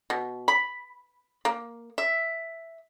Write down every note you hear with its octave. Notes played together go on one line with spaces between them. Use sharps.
B2
B5
A#3
E5